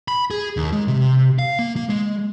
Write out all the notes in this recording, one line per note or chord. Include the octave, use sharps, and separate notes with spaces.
B5
G#4
D#2
G#3
C3
F5
A#3
A#3
G#3